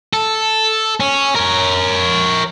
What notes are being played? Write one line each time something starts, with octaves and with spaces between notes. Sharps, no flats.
A4
C#4
A#4 C#5